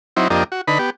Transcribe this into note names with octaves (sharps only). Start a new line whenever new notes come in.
F#3 C4 D#4 E4
F2 A#3 D4 G4 D#5
F#4
D3 D#4 B4 B5
B3 G4